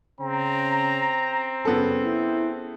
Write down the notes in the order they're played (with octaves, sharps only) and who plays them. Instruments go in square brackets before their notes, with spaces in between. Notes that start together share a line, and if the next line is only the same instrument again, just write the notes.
[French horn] C#3 [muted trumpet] C4 [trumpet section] A#5
[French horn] F#2 [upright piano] C#3 B3 A4
[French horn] E4